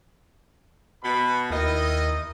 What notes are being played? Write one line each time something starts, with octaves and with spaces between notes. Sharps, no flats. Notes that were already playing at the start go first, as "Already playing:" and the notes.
B2 B5
D#2 D#3 E4 D#5